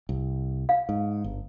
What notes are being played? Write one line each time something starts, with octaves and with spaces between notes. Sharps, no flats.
C2
F5
G#2
G1